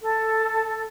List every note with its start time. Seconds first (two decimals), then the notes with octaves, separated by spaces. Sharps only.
0.02 A4